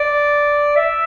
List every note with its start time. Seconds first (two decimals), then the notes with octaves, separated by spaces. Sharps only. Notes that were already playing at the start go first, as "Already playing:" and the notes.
Already playing: D5
0.76 E5